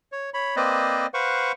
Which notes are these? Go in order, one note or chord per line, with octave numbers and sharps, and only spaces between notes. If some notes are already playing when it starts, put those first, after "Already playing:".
C#5
C#5 B5
A#3 C4 B4 C5 D5 D#5
B4 C5 F5 F#5 C#6